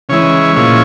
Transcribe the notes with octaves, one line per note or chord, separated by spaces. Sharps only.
C#3 E3 G#3 E4 C#5
A#2 F3 G#3 C#4 E4